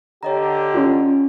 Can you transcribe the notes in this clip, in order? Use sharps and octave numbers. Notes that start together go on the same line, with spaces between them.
D3 G4 C#5 D#5 A#5
C#4 F4